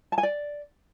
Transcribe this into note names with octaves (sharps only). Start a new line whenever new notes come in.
A5
G#5
D5